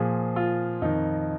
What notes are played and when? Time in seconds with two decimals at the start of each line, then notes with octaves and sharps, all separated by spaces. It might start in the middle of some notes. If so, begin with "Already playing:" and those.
Already playing: A#2 F3 G#4
0.36 F4
0.82 F2 D#3 D#4